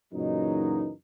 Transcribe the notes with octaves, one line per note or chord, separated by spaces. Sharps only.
F#2 A#2 C#3 E3 F#3 D#4